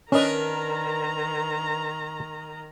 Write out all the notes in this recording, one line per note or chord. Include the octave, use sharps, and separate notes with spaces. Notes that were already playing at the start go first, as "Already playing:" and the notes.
D#3 C#4 D4 A#4 B4 D#5 A#5